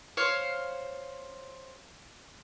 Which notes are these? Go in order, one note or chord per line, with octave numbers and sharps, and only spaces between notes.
C5 C#5 F5